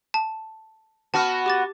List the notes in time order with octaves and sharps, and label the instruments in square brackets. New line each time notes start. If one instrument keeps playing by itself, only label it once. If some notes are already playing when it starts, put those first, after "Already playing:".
[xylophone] A5
[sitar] B3 F#4 [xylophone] A5 F6
[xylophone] G4 D6 A6